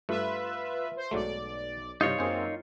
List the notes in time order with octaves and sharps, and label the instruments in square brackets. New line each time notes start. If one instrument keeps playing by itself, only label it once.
[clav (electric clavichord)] G2 A3 [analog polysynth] F4 B4 E5
[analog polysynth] C5
[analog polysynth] B1 D5 [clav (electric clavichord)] G#2 F#3 A3
[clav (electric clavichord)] G2 C3 [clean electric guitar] D#4 F4 C#5
[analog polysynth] F#2 A#3 C4 [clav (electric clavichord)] G#4 C5 G#5